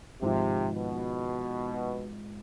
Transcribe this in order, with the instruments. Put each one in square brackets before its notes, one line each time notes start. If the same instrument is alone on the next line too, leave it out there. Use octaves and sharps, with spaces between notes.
[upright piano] G#1 G#2 F3 [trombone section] C3
[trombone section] B2